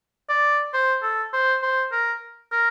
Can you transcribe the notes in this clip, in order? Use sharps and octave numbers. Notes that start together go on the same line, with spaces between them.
D5
C5
A4
C5
C5
A#4
A#4